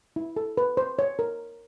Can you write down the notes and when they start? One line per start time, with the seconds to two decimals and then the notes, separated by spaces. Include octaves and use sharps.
0.16 E4
0.36 A4
0.57 B4
0.77 C5
0.99 C#5
1.19 A#4